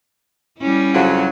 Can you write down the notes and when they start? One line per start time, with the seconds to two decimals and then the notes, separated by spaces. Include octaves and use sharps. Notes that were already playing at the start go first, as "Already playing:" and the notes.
0.59 G3 C#4 E4
0.95 F2 C#3 F#3